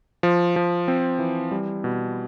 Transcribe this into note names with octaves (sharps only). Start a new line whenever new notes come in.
F3
F3
C4
E3
G3
B2